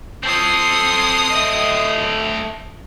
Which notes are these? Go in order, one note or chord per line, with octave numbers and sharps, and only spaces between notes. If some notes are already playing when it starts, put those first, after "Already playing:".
C4 A4 C6 D#6
A3 D#5